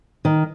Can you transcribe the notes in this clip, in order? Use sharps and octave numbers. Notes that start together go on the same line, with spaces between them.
D#3